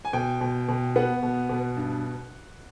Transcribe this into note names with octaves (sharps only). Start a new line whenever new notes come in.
G#5
B2 G5
B2
B2
B3 F#5
B2
B2
G2